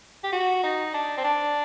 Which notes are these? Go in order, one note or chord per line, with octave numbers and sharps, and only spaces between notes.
G4
F#4
D#4
D4
C4
D4